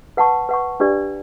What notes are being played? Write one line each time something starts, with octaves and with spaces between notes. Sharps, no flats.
B4 F#5 A5 C#6
B4 F#5 C#6
D4 G4 B4 D5